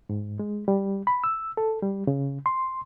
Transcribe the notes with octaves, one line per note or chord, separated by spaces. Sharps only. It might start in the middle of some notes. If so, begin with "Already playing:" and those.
G#2
G#3
G3
B5
E6
A4
G3
C#3
C6